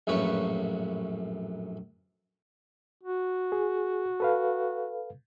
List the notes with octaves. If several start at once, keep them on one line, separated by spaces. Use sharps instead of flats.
A#1 F#2 A2 F#4 B4 C#6
F#4
G#4
A4 B4 F5